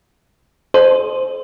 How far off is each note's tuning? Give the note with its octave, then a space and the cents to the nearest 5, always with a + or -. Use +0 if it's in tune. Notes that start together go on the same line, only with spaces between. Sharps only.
A4 -35 C5 +0 D#5 -35